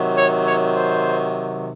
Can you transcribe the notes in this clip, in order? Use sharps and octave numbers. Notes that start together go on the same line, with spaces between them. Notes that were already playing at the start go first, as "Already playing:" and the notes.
Already playing: C3 D#3 F#3
C#5
C#5
C5